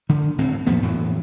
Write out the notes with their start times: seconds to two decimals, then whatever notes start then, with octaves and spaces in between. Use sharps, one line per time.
0.09 D3 D#3
0.38 D1 G#1 A2 C4
0.66 F2 A#2 F3 B3
0.82 F2 A2 E3